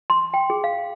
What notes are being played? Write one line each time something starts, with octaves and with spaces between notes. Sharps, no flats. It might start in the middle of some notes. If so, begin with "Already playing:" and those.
C6
G5
G#4
F5